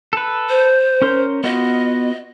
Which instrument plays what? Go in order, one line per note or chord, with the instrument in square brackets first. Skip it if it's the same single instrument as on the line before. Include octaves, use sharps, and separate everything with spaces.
[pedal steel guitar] A4 B4
[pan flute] C5
[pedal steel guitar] C#4 A#4 C6
[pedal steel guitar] B3 F4 F#4 [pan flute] D#5